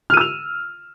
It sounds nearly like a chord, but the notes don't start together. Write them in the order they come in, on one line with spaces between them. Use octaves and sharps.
F6 D#7 E6 F7